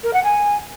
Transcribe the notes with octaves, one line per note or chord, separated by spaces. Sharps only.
A#4
F#5
G#5